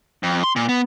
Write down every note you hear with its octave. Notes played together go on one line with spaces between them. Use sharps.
F2
C6
A#2
B3